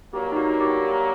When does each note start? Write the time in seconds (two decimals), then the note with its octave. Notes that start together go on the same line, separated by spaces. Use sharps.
0.13 G2 F#3 A#3 G4
0.32 D#4
0.37 F#4
0.61 G4